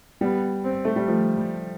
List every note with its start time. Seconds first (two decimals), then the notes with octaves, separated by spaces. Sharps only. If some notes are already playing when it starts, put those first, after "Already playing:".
0.21 G3 B3
0.64 C4
0.85 A3
0.96 G3
1.07 F3 A3
1.37 G3